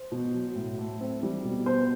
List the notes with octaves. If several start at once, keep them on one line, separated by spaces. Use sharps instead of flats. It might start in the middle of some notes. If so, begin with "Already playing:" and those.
Already playing: C5
B2
F#3
A2
A3
C4
G3
B2
B3 C5